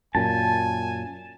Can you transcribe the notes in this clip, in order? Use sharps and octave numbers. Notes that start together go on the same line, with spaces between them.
F#2 A#2 G#5 A5